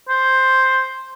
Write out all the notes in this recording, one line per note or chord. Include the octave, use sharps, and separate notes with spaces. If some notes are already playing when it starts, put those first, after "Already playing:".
C5